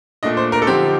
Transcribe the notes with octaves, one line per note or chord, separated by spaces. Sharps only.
A#2 A3 D4 D#5
C5
A#4
A4
D3 F3 C4 D#4 G4